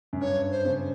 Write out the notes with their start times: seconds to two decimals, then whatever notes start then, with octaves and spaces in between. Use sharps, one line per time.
0.13 F#2
0.21 G2 C#5
0.51 C5
0.65 C#3